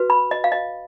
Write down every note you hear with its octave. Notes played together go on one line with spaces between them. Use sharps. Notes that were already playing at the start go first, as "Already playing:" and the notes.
Already playing: F#4 B4
B5
D#5
F5
D#5